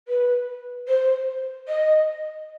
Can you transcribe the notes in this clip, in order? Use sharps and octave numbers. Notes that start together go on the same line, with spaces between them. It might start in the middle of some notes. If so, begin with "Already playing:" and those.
B4
C5
D#5